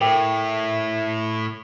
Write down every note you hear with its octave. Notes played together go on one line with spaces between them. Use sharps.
A2 A#4 G5 D6